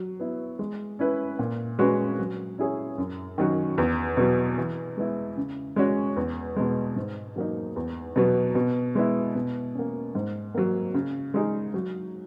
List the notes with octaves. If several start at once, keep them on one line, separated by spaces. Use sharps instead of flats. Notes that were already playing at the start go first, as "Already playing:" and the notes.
Already playing: F#3
B3 E4
G#3
C#4 E4 B4
A#2
G#3 C#4 F#4 B4
F#3
C#4 E4 G#4 C#5
F#2
D#3 F#3 C#4 F#4
E2
B2 F#3
E3
G#3 B3 E4
C#3
G#3 C#4 F#4 C#5
E2
B2 G#3
G#2
F#3 A#3 D#4
E2
B2 F#3 B3
B2
G#3 B3 E4
B2
A#3 C#4
G#2
F#3 A#3
C#3
G#3 D#4 G#4
F#3